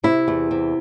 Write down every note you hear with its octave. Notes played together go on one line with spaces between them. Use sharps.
C3 E4
E2
C3